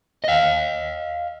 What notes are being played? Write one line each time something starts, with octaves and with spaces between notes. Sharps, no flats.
D#5 F5